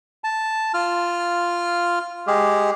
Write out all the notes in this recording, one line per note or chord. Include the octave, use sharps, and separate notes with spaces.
A5
F4 F6
G#3 G4 G#4